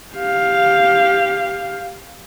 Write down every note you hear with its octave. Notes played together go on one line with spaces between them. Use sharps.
G4 F5